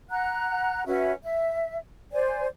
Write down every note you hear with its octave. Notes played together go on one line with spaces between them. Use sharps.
F#5 A#5 F#6
C#4 F#4 B4 E5
E5
C5 D5 G#5